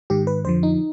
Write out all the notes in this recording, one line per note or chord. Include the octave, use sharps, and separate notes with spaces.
G#2 D#3 G4
B4
F2 D3 F3 C5
D#4